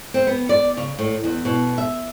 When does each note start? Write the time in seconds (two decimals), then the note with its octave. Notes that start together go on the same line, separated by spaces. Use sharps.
0.14 C4
0.27 B3
0.49 D5
0.77 C#3
0.99 A2
1.24 E2
1.45 B2
1.78 E5